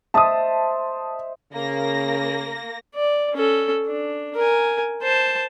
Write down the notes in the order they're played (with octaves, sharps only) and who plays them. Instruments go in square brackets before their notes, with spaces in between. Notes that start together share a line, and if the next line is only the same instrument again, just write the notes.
[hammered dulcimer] C5 D#5 E5 [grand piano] A5 D#6
[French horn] C#3 [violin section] A#3 A#6
[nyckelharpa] D5
C#4 A4
D4
A#4 G#5
C5 A5